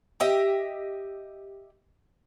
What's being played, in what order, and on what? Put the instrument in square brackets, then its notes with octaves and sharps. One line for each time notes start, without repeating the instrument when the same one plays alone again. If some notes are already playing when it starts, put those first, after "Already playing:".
[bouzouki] G4 D#5 E5